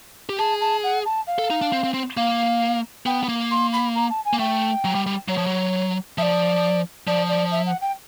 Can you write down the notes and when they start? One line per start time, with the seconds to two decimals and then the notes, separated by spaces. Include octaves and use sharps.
0.29 G4
0.38 G#4 A5
0.61 A5
0.83 F#5
1.05 A5
1.27 F5
1.38 A4
1.50 D#4
1.62 D4
1.73 C4
1.84 C4
1.94 C4
2.17 A#3 F5
3.06 B3 G5
3.23 B3
3.28 A#3
3.51 C6
3.73 B5
3.95 A#5
4.10 A5
4.25 G#5
4.33 A#3
4.39 A3 G5
4.84 F#3
4.95 G3
5.06 G3
5.28 F#3 C#5
5.38 F3
5.46 F#3
6.18 F3 E5
6.22 D5
7.07 F3 D5
7.29 D5
7.51 E5
7.66 F#5
7.81 G5